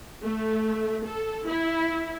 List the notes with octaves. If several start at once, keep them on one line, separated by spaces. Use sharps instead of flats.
A3
A4
E4